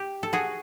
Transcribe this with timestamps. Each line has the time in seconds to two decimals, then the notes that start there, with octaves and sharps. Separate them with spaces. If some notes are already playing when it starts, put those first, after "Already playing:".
Already playing: G4
0.23 A4
0.33 F#4 G#4